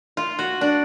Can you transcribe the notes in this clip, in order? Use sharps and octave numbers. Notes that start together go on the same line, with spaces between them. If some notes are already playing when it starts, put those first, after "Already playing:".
F4
F#4
D4